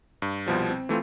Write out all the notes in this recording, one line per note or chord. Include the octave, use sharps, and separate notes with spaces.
G2
C2 B2 F3 G3
C4
E3 A3 C4 F4